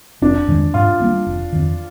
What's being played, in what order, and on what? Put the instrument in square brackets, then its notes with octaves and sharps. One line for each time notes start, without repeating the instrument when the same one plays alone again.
[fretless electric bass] F1 [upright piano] D4
[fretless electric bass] F2 D#3 G#3
[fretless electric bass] G#2 [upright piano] F4
[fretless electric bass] G3 A#3 D4
F1
F2 D#3